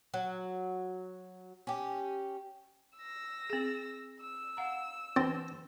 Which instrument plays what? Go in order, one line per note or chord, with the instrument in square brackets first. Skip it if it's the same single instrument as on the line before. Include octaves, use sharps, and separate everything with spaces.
[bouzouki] F#3
C#4 G4
[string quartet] E6 A#6
[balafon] C4 G#4
[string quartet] E6
[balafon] F5 F#5 A#5
[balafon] E3 D4 B4 [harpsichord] C4